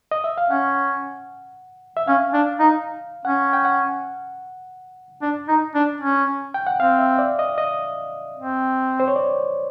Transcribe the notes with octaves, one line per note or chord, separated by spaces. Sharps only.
D#5
E5
F5
C#4 F#5
E5
C#4 F5
D4
D#4
C#4 F#5
G5
F#5
D4
D#4
D4
C#4
G5
F#5
C4 F5
E5
D5
D#5
D#5
C4
C5
C#5
D5